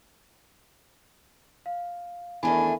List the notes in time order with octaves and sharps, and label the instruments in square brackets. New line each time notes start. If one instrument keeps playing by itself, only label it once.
[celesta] F5
[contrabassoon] E2 [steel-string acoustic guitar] D#3 A3 D4 [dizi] G#5 [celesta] B5